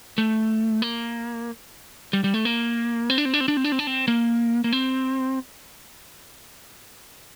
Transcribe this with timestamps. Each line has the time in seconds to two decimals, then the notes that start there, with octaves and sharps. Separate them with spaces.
0.18 A3
0.82 A#3
2.13 G3
2.24 G3
2.34 A3
2.45 A#3
3.10 C4
3.18 D4
3.25 C4
3.34 D4
3.40 C4
3.48 D4
3.57 C4
3.64 D4
3.72 C4
3.79 D4
3.87 C4
4.08 A#3
4.64 A#3
4.72 C4